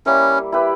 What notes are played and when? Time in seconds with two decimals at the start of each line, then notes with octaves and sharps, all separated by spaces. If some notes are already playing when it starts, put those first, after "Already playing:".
0.06 G3 A#3 C#4 E4 A#4
0.52 E4 G4 B4